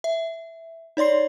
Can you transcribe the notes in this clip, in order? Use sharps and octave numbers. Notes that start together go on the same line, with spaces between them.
E5
D#4 C#5 D5 C6 C7